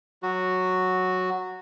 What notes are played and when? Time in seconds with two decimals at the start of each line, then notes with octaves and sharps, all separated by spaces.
0.23 F#3 F#4